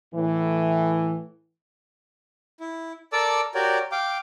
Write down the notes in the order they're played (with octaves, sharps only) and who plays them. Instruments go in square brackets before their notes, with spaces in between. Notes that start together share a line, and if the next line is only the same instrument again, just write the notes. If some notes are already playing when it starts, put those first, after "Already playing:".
[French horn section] A2 E3
[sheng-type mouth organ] E4
A4 A#4 D5 A5 D6 E6
F#4 G4 A#4 C#5 D5
F5 G5 D6